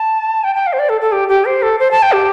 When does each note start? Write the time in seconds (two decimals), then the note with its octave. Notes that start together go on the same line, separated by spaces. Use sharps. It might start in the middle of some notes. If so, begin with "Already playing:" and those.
Already playing: A5
0.44 G5
0.55 G5
0.67 F5
0.73 C5
0.79 D5
0.89 A4
1.01 A4
1.12 G4
1.28 G4
1.45 C5
1.62 A4
1.79 C5
1.91 A5
2.02 G5
2.13 G4